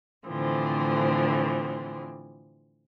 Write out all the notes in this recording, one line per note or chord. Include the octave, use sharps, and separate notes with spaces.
A2 D3 E3 F3 C4